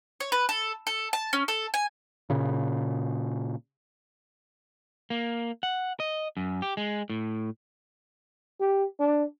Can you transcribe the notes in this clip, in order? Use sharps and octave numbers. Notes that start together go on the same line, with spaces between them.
C#5
B4
A4
A4
A5
C#4
A4
G#5
A#2 C#3
A#3
F#5
D#5
F#2
G4
G#3
A2
G4
D4